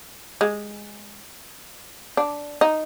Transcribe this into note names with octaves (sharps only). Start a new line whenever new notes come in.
G#3
D4
D#4